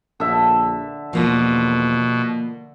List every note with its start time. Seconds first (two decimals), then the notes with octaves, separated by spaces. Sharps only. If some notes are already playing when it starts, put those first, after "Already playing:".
0.20 A#1 D3 E5
1.13 E2 B2 F3 A#3 F4